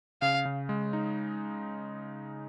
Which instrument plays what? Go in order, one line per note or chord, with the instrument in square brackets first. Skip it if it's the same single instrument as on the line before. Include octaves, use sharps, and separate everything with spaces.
[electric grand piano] C#3 [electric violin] F5
[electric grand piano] C#3
G#3
D#4